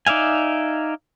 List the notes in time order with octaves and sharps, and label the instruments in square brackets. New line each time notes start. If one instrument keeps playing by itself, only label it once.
[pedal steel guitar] D#4 D5 E5 F5 G#5